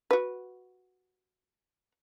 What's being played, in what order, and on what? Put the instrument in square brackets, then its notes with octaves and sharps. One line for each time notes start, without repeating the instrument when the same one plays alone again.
[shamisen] F#4 B4